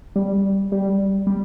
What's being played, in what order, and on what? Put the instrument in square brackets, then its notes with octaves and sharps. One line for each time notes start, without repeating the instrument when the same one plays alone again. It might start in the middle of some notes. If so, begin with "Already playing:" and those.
[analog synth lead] G3
G3
G3